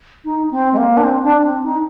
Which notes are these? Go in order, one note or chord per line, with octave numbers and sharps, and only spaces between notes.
D#4
C4
G#3
A#3
D4
C4
D4
C4
D#4